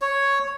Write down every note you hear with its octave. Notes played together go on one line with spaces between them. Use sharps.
C#5